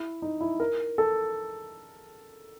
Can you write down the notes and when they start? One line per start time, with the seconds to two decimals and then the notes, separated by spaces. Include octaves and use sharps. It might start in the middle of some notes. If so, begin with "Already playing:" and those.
Already playing: E4
0.22 D#4
0.41 E4
0.60 A#4
0.98 A4